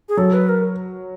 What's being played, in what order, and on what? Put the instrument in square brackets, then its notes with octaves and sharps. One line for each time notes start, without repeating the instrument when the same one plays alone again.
[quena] G#4
[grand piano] F#3 [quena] A4
[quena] B4
A#4